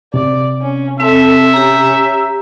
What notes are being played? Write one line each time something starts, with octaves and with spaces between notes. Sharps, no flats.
C3 D5
C#4
C4 A4 E5
C#4 G4 A#5